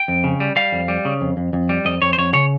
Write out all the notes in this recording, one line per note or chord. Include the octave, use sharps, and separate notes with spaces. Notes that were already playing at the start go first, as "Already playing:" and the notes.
Already playing: G5
F2
C#3
G3
G3 F5
F2
G3
C#3
F2
F2
F2
G3
F2 D#5
F2 C#5
C5
F2 C#5
C#3 C#5